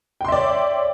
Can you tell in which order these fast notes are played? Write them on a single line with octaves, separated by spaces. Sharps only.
G5 C6 E5 D5 C#5